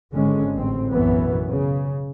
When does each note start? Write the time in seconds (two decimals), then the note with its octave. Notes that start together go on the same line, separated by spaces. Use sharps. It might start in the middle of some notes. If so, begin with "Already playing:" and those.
0.13 G#1 D3 G#3 C#4
0.55 A1 C4
0.91 B1 F#2 E3 B3
1.48 C#3